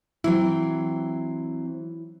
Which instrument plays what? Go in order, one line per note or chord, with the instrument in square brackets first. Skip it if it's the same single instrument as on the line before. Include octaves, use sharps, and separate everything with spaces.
[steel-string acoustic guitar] E3 F#3 C4 [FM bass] E4